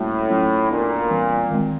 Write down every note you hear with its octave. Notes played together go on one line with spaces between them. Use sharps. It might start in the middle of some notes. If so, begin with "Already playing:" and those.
Already playing: A2 G3 A#3 C#4 F#4
F#3 A3 C#4 F4
A#2 B3 D4 F#4 A#4
E3 G3 C4
D#3 G#3 C4